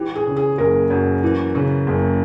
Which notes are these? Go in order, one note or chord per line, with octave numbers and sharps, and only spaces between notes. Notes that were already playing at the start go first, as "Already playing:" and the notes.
Already playing: E3 G4
G#4
C#3
G#4
F#1 A#4
F#2
E3
C#3
F#1